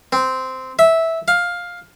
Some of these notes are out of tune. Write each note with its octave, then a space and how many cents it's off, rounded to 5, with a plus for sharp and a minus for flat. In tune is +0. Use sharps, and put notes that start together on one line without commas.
C4 -10
E5 -10
F5 +10